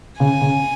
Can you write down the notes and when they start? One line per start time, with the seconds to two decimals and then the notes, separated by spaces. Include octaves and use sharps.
0.20 C#3 G#5
0.41 C#3